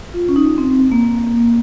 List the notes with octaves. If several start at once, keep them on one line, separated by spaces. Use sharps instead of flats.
F4
C#4
D#4
C4
A#3